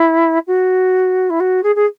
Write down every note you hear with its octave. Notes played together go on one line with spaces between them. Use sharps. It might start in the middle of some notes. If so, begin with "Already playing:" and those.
Already playing: E4
F#4
E4
F#4
G#4
G#4